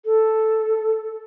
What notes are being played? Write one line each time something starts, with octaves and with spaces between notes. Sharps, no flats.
A4